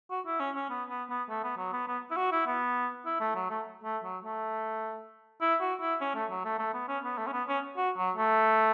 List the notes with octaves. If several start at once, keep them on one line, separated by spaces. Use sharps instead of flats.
F#4
E4
C#4
C#4
B3
B3
B3
A3
B3
F#3
B3
B3
E4
F#4
E4
B3
E4
A3
F#3
A3
A3
F#3
A3
E4
F#4
E4
C#4
A3
F#3
A3
A3
B3
C#4
B3
A3
C#4
B3
C#4
F#4
F#3
A3